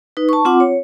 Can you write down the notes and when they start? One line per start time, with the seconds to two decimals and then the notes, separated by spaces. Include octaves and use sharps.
0.17 D#4 B4
0.29 A5 C#6
0.45 C4 F4 F#5 D6
0.60 C#5